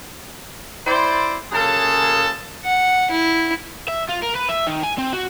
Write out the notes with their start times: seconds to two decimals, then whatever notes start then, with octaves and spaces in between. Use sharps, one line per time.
0.86 E4 C5 D5
1.52 F#2 C#3 A#3 G#4 A4 A5
2.64 F#5
3.11 E4
3.88 E5
4.09 F4
4.23 A#4
4.36 B4
4.49 E5
4.67 D#3
4.83 G#5
4.98 C4
5.13 F#4